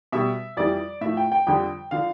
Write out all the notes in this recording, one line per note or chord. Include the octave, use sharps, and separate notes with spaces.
B2 G3 E5
F2 E3 G3 D5
A2 F3 E5
G5
G5
F2 D3 G3 G5
D3 F3 F5